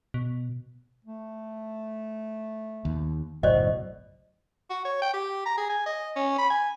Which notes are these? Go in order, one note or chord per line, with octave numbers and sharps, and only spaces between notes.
B2
A3
D#2
F#1 B1 A2 F#4 C5 D5 D#5
F#4
C#5
G5
G4
A#5
G#4
G#5
D#5
C#4
B5
G#5